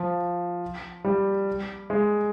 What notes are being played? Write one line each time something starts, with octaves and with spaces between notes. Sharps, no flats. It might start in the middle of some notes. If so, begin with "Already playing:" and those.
Already playing: F3
G3
G#3